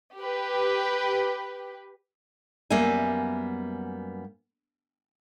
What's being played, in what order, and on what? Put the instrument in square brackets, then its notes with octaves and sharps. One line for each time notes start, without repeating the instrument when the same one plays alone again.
[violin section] G4 B4
[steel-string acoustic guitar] F#2 G3 A#3 B3 E5 G#5